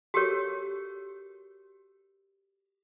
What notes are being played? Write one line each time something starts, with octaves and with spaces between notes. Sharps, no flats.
F#4 G4 A4 A#4 C#5